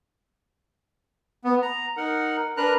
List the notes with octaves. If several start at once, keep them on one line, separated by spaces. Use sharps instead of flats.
B3
A#5
D#4 A#4 F#5
D4 A#4 B4 A#5 F#6